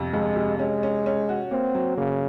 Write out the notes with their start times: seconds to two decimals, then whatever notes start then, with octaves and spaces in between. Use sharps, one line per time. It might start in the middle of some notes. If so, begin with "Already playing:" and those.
Already playing: F2 C3
0.14 F2 G#3
0.36 C3
0.59 G#3 C#4
0.83 C#4
1.06 C#4
1.29 F#4
1.51 A#3 C4
1.75 F#3
1.97 C#3 A#3